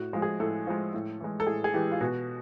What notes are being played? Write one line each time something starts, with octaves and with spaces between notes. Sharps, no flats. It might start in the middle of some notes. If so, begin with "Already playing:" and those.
Already playing: A2 F#4
F3 G#3
G#4
A2 A4
F3 G#3
A2
E3 G#3
A4
A2 G#4
G#4
E3 G#3 G4
F4
B2 F#4